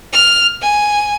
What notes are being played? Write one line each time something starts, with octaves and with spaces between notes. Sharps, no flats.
F6
G#5